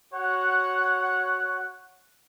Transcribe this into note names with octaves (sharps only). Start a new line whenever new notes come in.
F#4 C#5 F#5